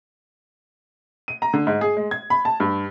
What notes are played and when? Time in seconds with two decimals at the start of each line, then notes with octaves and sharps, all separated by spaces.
1.28 D#7
1.42 A#5
1.54 D3
1.67 G#2
1.81 G#4
1.97 G#3
2.11 G#6
2.30 B5
2.45 A5
2.60 G2